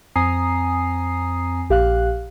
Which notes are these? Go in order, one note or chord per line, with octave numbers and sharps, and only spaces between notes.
F2 C4 G#5 A#5 D#6 C7
A#1 G4 F5 F#6